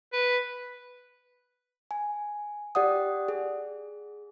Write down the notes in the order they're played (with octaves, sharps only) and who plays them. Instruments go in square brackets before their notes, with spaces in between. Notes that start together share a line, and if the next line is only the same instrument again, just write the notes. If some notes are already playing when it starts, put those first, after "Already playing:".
[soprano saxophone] B4
[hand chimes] G#5
G4 D5 F#5 D#6
G#4